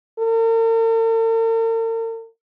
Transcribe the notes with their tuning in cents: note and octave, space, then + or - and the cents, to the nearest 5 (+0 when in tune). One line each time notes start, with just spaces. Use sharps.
A#4 -45